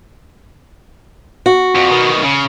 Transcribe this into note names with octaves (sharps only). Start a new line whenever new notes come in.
F#4
F2
B2 D#3
C#3